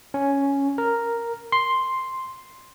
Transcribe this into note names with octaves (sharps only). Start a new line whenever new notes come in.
C#4
A#4
C6